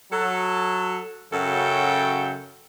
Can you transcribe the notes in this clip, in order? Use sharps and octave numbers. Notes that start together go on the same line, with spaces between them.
F#3 A4
F#2 C#3 F#3 A4 G5